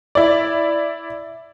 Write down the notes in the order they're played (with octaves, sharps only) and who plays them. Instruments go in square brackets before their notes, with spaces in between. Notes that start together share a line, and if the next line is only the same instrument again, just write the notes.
[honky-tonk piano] E4 D5